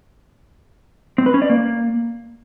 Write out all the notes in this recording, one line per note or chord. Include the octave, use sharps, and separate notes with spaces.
C4
B4
C#4
D5
A#3